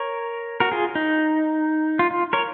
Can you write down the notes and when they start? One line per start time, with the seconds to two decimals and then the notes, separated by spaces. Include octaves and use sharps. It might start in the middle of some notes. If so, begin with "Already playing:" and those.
Already playing: A#4 C#5
0.60 F#4 A#4
0.72 F4 G#4
0.95 D#4
1.99 F4
2.11 F4
2.33 A#4 C#5